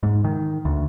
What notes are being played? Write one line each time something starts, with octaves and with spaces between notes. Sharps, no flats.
G#2
D#3
D2